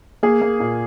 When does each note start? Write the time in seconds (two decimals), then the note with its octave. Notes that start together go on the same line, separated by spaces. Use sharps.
0.23 A#3 G#4
0.42 A#3
0.60 A#2